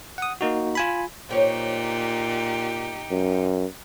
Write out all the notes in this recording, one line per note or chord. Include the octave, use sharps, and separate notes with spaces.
F#5 D#6
A#3 D#4 F#4
F4 G#5 B5
A#2 D#4 G4 C5 C#5
F#2